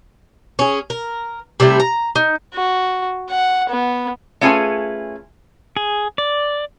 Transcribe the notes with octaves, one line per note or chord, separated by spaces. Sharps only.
C#4 G#4
A#4
C3 G3 A3 E4
A#5
D#4
F#4
F#5
B3
A3 C#4 F4 G#4 B4 G#5
G#4
D5